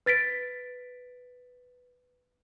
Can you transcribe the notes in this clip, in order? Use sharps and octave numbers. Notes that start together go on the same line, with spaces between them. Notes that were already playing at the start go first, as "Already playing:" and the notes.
B4 A6 B6 D7